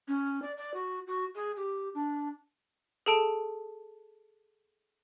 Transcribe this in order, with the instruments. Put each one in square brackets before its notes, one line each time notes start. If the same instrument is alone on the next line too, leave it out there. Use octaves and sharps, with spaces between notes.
[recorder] C#4
D5
D5
F#4
F#4
G#4
G4
D4
[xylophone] G#4 A4 A5 D7